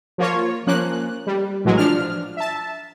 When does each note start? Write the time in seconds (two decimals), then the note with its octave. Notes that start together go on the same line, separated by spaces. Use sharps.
0.18 F3 A#3 F4 C#5
0.67 F3 A#3 C#4 F#6
1.27 G3
1.64 A#1 A2 E3 F#3 G#3
1.78 F3 D4 F6
2.37 E5 A5